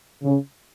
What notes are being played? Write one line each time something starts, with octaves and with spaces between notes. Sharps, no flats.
C#3